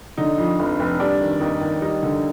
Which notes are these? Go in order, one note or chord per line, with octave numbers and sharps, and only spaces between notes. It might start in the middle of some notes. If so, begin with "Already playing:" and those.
D3 D#4
F2
F1
F1
G3 D4
D#3
D#2 D#4
D#2
G3 D#4
D3